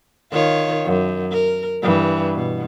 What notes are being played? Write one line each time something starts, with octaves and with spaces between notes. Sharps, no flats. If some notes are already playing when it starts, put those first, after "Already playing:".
D#3 F4 C#5
F#2
A#4
G2 E3
B2